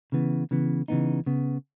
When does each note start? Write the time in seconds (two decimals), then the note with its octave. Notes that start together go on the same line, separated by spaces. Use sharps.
0.12 C#3 E3 B3
0.51 C#3 E3 B3
0.88 C#3 E3 B3 D#4
1.26 C#3 B3